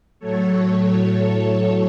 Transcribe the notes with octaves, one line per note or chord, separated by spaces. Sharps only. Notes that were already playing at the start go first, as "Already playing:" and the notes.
A2 F#3 A3 A4 C#5